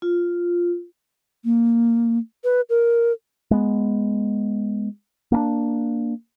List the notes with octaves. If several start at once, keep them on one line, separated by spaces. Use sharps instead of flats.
F4
A#3
B4
A#4
G#3 B3
A#3 C4 D4